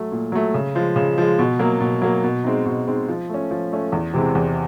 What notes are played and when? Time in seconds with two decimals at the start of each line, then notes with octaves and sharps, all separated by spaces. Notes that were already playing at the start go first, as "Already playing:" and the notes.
Already playing: F#3 A3
0.12 A#2
0.32 F#3 A3
0.54 C#3
0.75 F3 G#3
0.96 C#3
1.18 F3 G#3
1.39 B2
1.59 F#3 A#3
1.80 B2
2.02 F#3 A#3
2.24 B2
2.44 G#3 C4 D#4
2.66 B2
2.88 G#3 C4 D#4
3.08 F3
3.29 A3 C#4
3.51 F3
3.72 A3 C#4
3.92 E2
4.14 C3 E3 G#3 C4
4.35 E2